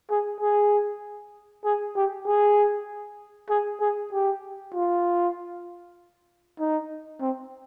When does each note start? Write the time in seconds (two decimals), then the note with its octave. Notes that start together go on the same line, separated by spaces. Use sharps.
0.10 G#4
0.41 G#4
1.65 G#4
1.96 G4
2.27 G#4
3.50 G#4
3.81 G#4
4.13 G4
4.74 F4
6.59 D#4
7.21 C4